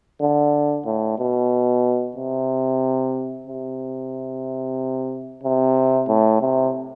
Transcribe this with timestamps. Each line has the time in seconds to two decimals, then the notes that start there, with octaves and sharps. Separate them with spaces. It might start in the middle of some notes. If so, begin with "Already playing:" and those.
0.21 D3
0.86 A2
1.19 B2
2.17 C3
3.47 C3
5.43 C3
6.08 A2
6.41 C3